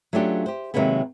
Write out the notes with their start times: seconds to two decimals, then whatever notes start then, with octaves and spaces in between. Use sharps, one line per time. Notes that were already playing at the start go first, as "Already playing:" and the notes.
0.13 F#3 A3 C#4 D4 F4 G4
0.46 G4 C5
0.74 C3 D#3 F#3 G#3 A#3 B3